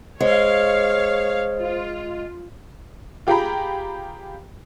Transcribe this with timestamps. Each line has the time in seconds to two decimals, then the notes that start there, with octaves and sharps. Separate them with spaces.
0.21 G#3 C5 C#5 F5
1.58 F4
3.27 F4 G4 G#4 G5 A#5 B5